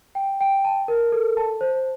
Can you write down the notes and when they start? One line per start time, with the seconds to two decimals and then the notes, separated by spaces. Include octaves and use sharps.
0.15 G5
0.41 G5
0.65 A5
0.88 A#4
1.12 A4
1.37 A5
1.61 C5